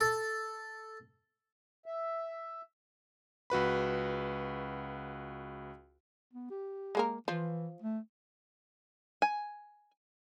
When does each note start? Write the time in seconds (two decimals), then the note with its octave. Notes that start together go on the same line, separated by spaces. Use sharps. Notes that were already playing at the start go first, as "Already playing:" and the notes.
0.01 A4
1.86 E5
3.50 C#2 F#4 B4 B5
6.33 B3
6.50 G4
6.95 G#3 A#3 A#4
7.28 E3 F3 F4
7.82 A3
9.22 G#5